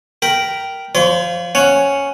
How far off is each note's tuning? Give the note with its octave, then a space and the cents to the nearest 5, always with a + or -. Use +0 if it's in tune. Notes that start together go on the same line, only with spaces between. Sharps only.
A#4 +0 G5 -10 B5 +0
F3 +0 C#5 +35 C6 -45
C#4 +0 F#5 +0